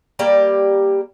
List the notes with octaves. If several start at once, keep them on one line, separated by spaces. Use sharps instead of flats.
G3 A#3 G4 D5